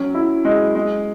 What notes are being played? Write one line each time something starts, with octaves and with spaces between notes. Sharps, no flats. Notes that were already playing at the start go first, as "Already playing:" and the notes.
Already playing: F#3 C#4
E4
G#3
G#3